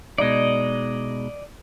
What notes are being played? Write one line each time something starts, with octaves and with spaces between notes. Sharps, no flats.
B2 G#3 D#4 D5 D#5